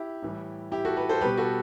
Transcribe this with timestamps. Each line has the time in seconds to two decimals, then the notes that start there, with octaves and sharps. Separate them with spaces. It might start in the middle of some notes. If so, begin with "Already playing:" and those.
Already playing: E4 G4
0.22 A2 E3 G3
0.72 E4 G4
0.85 F#4 A4
0.96 G4 B4
1.09 A4 C5
1.21 B2 G3 G4 B4
1.38 F#4 A4